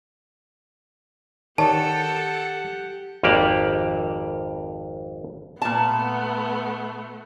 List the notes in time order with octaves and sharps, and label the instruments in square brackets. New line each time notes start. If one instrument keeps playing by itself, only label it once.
[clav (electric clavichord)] D#3 C#5 D5 [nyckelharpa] G4 F#5 [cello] A4 [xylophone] A5
[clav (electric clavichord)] G#1 F2 A#3 G4 D5
[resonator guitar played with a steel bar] A#2 A5 [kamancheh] A3 B3